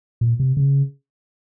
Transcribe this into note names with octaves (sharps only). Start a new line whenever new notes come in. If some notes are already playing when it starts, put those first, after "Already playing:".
A#2
C3
C#3